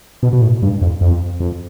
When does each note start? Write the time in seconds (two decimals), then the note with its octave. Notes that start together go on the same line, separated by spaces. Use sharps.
0.23 B2
0.33 B2
0.42 A2
0.62 G2
0.82 F2
1.01 F2
1.40 F2